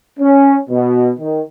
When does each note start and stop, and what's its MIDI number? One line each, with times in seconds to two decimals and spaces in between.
0.20 0.56 61
0.70 1.08 47
1.19 1.42 51